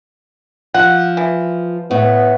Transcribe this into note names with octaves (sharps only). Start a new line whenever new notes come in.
F3 F#5
E3
A2 B3